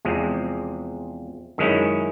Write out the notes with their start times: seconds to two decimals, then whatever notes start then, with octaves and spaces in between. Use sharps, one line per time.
0.05 E2 C3 F3 G#3 C4
1.58 F#2 D#3 G#3 C#4 E4